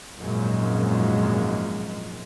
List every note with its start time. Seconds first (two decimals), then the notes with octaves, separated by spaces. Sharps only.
0.20 G#1 F#2 A#2 F3 G#3